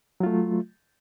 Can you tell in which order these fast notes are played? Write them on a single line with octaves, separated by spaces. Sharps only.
F#3 F4 A3